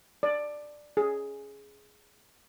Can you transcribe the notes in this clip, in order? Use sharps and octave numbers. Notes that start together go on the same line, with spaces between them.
D5
G#4